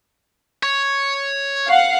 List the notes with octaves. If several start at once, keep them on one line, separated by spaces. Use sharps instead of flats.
C#5
F5 F#5